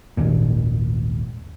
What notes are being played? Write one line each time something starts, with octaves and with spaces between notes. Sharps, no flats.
D#1 G#1 D#2 A#2